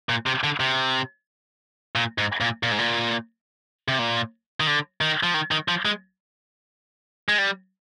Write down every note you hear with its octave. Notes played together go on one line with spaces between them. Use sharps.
A#2
C3
D3
C3
A#2
G#2
A#2
A#2
G#2
A#2
C3
A#2
D#3
D3
D#3
F3
D#3
D#3
F3
G#3
G#3
G3